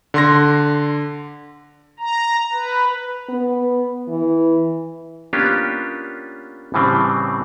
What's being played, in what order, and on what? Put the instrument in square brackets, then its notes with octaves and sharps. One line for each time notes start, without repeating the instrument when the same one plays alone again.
[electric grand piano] D3 C6 A#6
[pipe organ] A#5
B4
[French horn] B3
E3
[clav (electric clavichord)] A#3 B3 C#4 D4 F4 G4
A2 C#3 E3 G3 C4